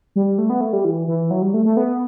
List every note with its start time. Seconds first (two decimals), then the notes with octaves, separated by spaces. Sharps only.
0.16 G3
0.38 A3
0.50 B3
0.61 A3
0.73 G3
0.85 E3
1.08 E3
1.31 F#3
1.42 G3
1.54 A3
1.65 A3
1.77 B3